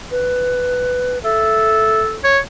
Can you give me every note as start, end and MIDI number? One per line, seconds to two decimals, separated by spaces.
0.11 1.18 71
1.24 2.18 69
1.24 2.01 76
2.24 2.39 73